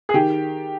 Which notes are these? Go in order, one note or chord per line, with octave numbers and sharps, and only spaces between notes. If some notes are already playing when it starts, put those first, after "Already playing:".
G#4
D#3 G4